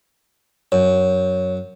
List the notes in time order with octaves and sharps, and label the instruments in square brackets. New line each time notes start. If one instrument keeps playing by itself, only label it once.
[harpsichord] F#2 [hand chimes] C#5